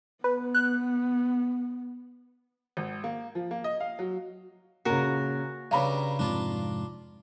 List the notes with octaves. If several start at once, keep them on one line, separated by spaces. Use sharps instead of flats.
B3 B4
F#6
G#1
A#3
F3
A#3
D#5
F5
F#3
A#2 C#3 F#4 A#4
G2 C#3 G3 F5 A#5 B5
F2 G#2 C3 D4 F4